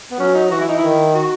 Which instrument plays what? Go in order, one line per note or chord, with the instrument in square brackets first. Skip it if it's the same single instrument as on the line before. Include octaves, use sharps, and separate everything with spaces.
[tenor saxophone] B3
[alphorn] F#3 [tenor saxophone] C#4
[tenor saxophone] D#4
[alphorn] E3 [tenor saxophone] F#4
[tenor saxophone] E4
D#4
[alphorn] D#3 [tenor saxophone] E4
[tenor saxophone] F#4